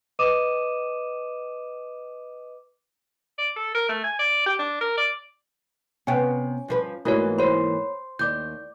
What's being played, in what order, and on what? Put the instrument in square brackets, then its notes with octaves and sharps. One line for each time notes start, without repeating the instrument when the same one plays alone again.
[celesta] B4 D#5 D6 D#6 D#7 E7
[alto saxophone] D5
A4
A#4
A3
G#5
D5
G4
D4
A#4
D5
[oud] C3 B3 [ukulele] C#4 G5 [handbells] G#5
[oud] G2 F3 B4
[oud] G#2 E3 A#3 [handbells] A3 F#4 C#5
[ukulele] C5 [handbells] C#5 B5
[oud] D#2 [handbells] D5 D6 G6